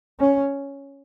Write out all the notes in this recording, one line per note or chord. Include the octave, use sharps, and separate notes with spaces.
C#4